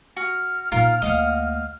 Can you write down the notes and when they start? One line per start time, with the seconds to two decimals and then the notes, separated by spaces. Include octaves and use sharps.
0.16 F#4 F6
0.72 A#2 D#4 F4 A#4
1.02 D2 A#3 D#5 F5 F#5